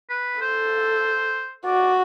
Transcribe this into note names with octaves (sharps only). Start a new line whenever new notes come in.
B4
A4 C5
F#4 D5